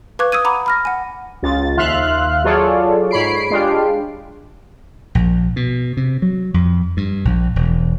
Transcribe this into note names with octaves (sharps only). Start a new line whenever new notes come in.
B4 F5 C#6 D6 F#6 G#6
D#6 E6 G#6 D#7
F#5 A#5 B5 D6
B5 F6 A#6
F#5 G#5
C#2 F4 A6
D#2 E5 F5 C6 F6 F#6
F#3 F4 G#4 A4 C#5 D5
G#2 C#5 B5 C7 D7
G#3 D4 F4 G4
A#1
B2
C3
F#3
F2
G2
A#1
E1